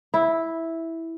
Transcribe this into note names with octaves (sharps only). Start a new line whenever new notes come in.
E4